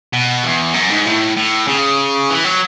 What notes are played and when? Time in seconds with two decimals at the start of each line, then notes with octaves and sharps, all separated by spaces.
0.13 B2
0.44 E2
0.74 F#2
0.90 G#2
1.06 A2
1.36 A2
1.68 C#3
2.30 E3
2.45 F#3